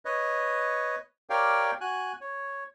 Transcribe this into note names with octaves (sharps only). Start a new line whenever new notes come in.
B4 C#5 D#5
G4 A#4 C#5 D5 F5 G5
F#4 G#5 F#6
C#5